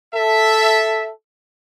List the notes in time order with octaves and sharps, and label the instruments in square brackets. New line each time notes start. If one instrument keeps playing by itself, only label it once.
[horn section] A4 E5